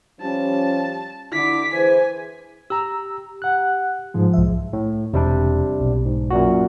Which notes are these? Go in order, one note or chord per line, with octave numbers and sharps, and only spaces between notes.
F3 G3 C#4 A5
D3 E4 D6 B6
E3 G#4 C5 G#5
G4 A#5 E6
F#5 F#6
G#2 F3 G#3
C2 E5
A2
E1 C3 G3 D4
B1
G#2
F#2 A#2 F#4